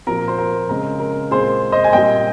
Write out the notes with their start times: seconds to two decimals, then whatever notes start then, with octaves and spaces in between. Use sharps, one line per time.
0.07 A#2 F3 C4 A#4
0.28 C5
0.38 A#4
0.69 C#3 G#3 C4 A#4
1.00 A#4
1.31 A#2 G#3 C4 G#4 C5
1.72 C5 D#5
1.84 G#5
1.93 A#2 G3 C4 D#5 G5